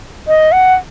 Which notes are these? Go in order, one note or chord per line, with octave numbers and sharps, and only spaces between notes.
D#5
F#5